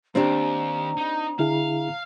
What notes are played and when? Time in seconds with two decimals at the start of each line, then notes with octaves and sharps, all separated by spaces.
0.15 D#2 C4 D4 G4 A#5
0.97 D#4
1.39 D3 E4 G#4 F5